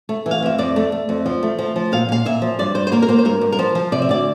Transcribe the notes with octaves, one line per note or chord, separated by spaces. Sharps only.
A3
E3
F5
F2 E5
F2 D5
A3
A3
F2
F3
A3
F3
F3
A#2 F5
A#2 F5
A#2 E5
F3
G2 D5
G2 C5
C5
A#3 A#4
A#4
A#3 C5
C5
G2 A#4
G2
A#4
F3 C5
F3
C3 D5
E5
D2 D5